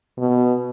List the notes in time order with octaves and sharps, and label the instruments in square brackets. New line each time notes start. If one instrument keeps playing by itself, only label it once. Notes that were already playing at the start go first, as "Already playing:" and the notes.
[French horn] B2